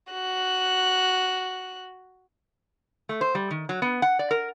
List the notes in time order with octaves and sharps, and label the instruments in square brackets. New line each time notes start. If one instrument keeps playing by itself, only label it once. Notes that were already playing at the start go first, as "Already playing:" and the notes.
[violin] F#4 F#6
[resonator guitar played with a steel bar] A3
C5
G3
D#3
F#3
B3
F#5
D5
A#4